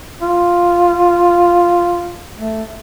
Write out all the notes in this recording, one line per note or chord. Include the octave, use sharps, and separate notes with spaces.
F4
A3